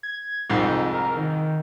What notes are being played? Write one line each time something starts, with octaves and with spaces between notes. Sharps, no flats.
G#6
C2 F2 G#2 D#4
A#4
D#3